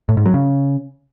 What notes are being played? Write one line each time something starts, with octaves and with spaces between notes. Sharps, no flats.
A2
G#2
F#3
C#3